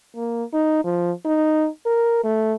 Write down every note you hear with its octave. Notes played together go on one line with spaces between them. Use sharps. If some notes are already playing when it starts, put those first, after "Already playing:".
A#3
D#4
F3
D#4
A#4
A3